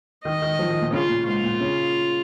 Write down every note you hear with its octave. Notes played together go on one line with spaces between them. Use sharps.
D#3 D#5
D#3
F3
D#3
A#2
C#3 F4
A#2
G#2 F4
A#2
C#3